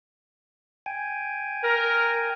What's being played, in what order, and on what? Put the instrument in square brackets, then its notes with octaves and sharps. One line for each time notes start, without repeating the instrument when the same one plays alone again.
[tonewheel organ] G5 G#5
[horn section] A#4